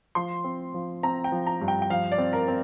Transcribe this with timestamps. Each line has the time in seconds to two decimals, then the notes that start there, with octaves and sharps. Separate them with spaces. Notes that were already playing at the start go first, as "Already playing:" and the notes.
0.15 F3 C6
0.44 C4
0.74 F3
1.03 C4 A#5
1.24 G5
1.32 F3
1.47 A#5
1.61 G2
1.68 G5
1.82 G5
1.90 F3 F5
2.12 D5
2.18 C4
2.33 A#4
2.48 C4